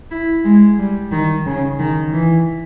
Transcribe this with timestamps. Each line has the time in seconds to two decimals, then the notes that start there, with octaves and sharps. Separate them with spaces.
0.11 E4
0.45 G#3
0.78 G3
1.12 D#3
1.46 C#3
1.79 D#3
2.13 E3